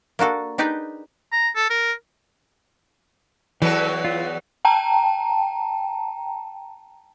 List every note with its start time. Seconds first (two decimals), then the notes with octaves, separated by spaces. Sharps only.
0.19 A#3 D4 F#4 A4
0.58 D4 D#4 G4 G#4 B4 D5
1.32 A#5
1.56 A4
1.70 A#4
3.62 E2 E3 F#3 A4 B4
4.05 F4
4.65 G5 A5 A#5